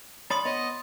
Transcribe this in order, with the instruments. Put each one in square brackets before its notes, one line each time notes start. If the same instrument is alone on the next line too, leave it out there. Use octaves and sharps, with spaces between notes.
[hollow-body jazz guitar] C#5 D5 B5 [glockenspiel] C6 D#6 A6
[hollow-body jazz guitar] B3 C#5 [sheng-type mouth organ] D#5